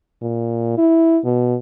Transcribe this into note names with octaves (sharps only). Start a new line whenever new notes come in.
A#2
E4
B2